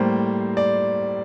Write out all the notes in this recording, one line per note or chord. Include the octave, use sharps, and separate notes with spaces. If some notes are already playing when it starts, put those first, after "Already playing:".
Already playing: A2 G3 A#3 C5
D5